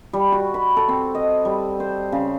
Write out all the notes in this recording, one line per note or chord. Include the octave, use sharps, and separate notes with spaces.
G3
F#4
B5
A4
C4
D#5
G3
C5
C#3